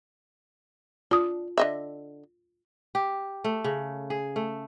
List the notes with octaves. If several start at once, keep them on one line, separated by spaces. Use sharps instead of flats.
D4 F4 D#6
D3 D#5 E5
G4
A3
C#3
G#4
A3